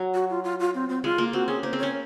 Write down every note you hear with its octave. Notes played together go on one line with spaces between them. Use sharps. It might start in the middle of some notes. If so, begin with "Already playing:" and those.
Already playing: F#3
F#4
F4
F4
F4
C4
C4
G#3 F4
A#3
C4 F#4
C#4 G#4
A#3 C5
C4
C#4 C#5